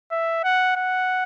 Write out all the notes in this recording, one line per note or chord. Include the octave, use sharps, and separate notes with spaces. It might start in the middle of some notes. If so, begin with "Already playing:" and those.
E5
F#5
F#5